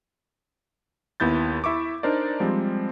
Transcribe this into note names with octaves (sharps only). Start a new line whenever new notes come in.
D#2 B3 E4 G6 A6
E4 E5 C#6 D6
D4 D#4 A#4 C5 D5
F3 G3 G#3 C4